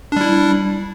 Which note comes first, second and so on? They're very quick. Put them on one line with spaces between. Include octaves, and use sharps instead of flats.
D4 G3 E4